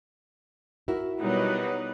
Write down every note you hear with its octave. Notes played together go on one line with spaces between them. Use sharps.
E4 F#4 A#4
B2 F#3 G3 D#4 B4